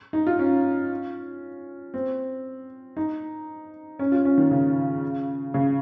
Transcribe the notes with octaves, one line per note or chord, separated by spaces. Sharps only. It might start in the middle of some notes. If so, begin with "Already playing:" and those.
D#4
F4
C#4
C4
D#4
C#4
F4
C#4
D#3
C#3
C#3